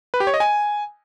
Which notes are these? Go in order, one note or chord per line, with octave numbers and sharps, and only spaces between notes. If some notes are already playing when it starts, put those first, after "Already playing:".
B4
G4
C#5
D#5
G#5